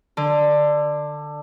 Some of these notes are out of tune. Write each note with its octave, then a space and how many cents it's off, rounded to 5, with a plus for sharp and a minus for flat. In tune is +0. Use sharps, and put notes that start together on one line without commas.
D3 +15